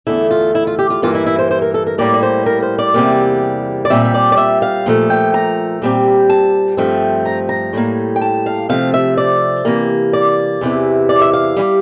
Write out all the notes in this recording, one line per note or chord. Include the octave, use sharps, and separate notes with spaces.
E2 D3 A3 E4
F4
E4
F4
G4
F4
G2 E3 A#3 F4
E4
E4
C5
C5
A#4
A4
A#4
A2 G3 A#3 D5
D5
C5
A#4
C5
D5
E2 C3 G3 A#3
D5
A#2 G3 C4 E5
E5
D5
D5
E5
F5
A#2 F3 A3
G5
A#5
A#2 G3 C4
A5
G2 F3 A3 C4
A#5
A#5
A2 G3 A#3
G5
A5
F5
C3 F3 A3 C4 F5
E5
D5
C3 E3 A#3
D5
E2 C3 E3
D5
E5
F5
E3 G3